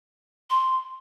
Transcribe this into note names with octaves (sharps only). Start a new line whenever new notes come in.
C6